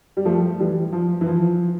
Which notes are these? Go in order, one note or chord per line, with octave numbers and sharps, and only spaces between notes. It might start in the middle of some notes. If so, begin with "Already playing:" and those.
G3
F3 A3
E3 G3
F3
E3
F3